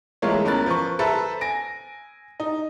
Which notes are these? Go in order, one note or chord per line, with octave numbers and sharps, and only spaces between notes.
E3 G#3 A3 F4 A#4 C#5
E2 C#4 A#4 B5 F#6 A6
F3 A#4 B4 B5 C#6
A4 B4 C5 E5 A#5 B5
G#5 A#6 D7
D#4